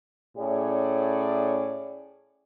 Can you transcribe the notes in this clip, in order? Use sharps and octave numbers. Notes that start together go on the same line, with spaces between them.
A2 C#4 G#4 C#5 D5